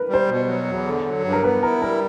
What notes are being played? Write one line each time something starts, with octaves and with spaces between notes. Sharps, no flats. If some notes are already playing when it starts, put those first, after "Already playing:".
Already playing: A#4 B4
G3 C5
B2
F#3
E2
D3
F#3
G2
A#4
B3 B4
E4 A#4
G3 A#4